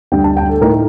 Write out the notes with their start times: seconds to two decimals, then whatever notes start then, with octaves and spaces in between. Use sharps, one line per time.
0.12 D2 D3 G3 D4 G5
0.24 A5
0.37 G5
0.49 A4
0.61 A2 A3 D#4 A#4